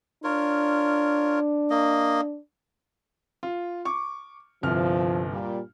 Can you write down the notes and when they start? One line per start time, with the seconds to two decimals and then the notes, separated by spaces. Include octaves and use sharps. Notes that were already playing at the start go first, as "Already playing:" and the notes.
0.24 D4 F4 A#4 C#5
1.70 A#3 D#5
3.43 F4
3.85 C#6 D6
4.63 G1 C2 F3 F6
5.31 A#2 G3